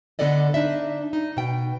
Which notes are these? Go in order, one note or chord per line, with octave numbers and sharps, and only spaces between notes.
D3 B3 C#4 A4 D5 D#5
D4 D#4 D5 E5
D#4
B2 G5